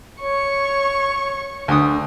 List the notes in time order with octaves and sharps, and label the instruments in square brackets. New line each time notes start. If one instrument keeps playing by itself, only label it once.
[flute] C#5 [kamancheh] C#6
[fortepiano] D2 D#6 [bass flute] D4